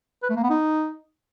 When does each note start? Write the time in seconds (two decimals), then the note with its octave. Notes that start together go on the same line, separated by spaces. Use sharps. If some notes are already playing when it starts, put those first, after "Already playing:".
0.23 B4
0.30 A3
0.36 A#3
0.43 B3
0.50 D#4